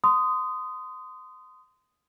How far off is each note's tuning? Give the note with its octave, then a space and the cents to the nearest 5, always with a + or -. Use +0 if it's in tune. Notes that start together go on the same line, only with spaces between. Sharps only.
C6 -25 D#6 +0